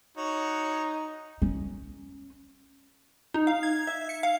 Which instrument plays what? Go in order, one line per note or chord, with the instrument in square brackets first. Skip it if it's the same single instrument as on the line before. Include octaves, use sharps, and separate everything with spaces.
[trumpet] D#4 [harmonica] F#4 C#5
[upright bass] C#4
[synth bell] D#4
F5
G#6
E5
C#7
F5